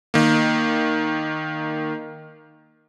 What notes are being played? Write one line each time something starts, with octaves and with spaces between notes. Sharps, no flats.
D#3 A#3